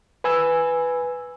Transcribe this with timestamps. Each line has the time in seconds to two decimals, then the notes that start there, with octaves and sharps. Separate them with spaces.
0.24 B4 G#5 E6